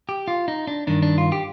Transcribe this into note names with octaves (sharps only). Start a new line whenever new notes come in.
G4
F4
D#4
D4
G2 D#3 D4
D4
F4
G4